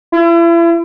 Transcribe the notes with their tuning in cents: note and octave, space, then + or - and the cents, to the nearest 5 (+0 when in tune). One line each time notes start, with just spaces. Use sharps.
E4 +40